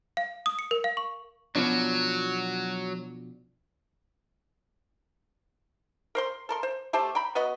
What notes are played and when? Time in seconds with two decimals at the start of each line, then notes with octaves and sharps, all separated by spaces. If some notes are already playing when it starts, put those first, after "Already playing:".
0.17 F5
0.46 D#6
0.59 C#7
0.71 A#4
0.84 F5
0.97 C#6
1.56 B2 F3 F#3 D4
6.15 A#4 C5 C6
6.49 A4 A#4 C6
6.63 C5
6.93 A3 G4 C5 A5
7.15 G5 A#5 B5
7.35 B3 F#4 B4 D#5